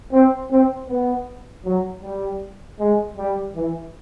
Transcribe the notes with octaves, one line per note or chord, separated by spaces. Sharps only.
C4
C4
B3
F#3
G3
G#3
G3
E3